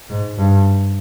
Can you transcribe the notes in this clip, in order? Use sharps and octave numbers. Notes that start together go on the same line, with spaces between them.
G#2
G2